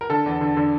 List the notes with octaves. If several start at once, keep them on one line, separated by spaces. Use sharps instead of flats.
A#4
D3 A4
E2
D3
D3